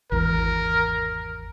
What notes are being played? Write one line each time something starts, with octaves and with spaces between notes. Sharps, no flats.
G#1 E2 A#4